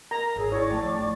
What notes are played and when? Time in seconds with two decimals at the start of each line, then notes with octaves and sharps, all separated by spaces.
0.11 A#4 A#5
0.36 G#1 G#4 C#5 E6
0.52 E4 C#5 D5 C#6 D6
0.70 F3 A3 A5
0.93 D4